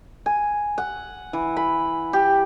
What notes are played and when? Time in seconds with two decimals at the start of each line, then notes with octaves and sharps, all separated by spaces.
0.26 G#5
0.78 F#5
1.33 E3
1.57 B5
2.13 G4